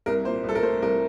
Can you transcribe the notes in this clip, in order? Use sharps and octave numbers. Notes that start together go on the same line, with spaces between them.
C2 A#4
A#2 C5
C2 A4
A#4
A3 C5
C2 A#4